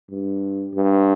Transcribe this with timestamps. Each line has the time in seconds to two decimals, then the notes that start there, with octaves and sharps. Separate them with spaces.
0.11 G2
0.74 G2